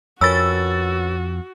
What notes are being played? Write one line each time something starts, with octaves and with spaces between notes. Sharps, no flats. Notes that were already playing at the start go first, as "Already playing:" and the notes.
F2 C#4 F#4 A#4 B4 E6 A6